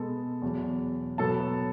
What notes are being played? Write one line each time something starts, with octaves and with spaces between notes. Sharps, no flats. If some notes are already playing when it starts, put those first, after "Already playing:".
Already playing: B2 G#3 B3 A4
E2 B2 F#3
B2 F#3 B3 A4 A5